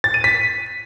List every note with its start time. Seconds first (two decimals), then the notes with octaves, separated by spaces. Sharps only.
0.04 A6
0.14 D#7
0.24 B6